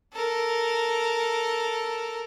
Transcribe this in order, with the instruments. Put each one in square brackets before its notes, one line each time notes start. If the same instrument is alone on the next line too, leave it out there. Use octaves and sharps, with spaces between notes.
[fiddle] A4 A#4